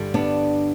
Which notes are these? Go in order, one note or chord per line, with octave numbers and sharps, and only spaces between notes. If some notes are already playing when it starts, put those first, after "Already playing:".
Already playing: G2 D3 G3
B3 D4